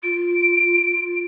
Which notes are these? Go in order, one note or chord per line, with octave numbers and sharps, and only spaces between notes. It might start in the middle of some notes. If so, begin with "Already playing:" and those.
F4 D7